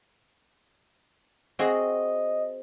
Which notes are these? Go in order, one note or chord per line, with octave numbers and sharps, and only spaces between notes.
C4 F#4 G#4 D#5